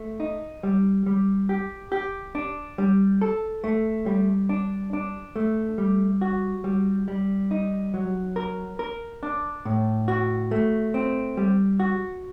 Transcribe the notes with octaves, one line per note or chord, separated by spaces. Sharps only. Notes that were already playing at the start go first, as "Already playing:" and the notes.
Already playing: A3
D#4
G3
G3
G4
G4
D4
G3
A4
A3
G3
D4
D4
A3
G3
F#4
G3
G3
D#4
F#3
A#4
A#4
D4
A2
F#4
A3
C4
G3
F#4